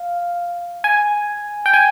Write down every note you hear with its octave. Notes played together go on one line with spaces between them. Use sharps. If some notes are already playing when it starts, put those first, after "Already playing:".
Already playing: F5
G#5
G5
G#5